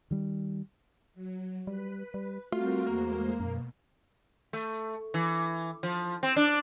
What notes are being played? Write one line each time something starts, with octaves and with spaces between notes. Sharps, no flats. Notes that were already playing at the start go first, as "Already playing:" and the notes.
D#3 G3
F#3
G3 B4
G3
G3 A3 C4 F4 F#4 A#4
E2 G#3 A#3 C5
F#2 B2
A3
E3
F3
C4
D4